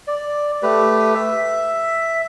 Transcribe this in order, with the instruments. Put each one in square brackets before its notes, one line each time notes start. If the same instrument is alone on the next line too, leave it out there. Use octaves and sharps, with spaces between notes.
[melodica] D5
A3 G4 B4
E5